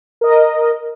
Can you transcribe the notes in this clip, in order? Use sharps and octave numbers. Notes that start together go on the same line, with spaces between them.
A#4 D#5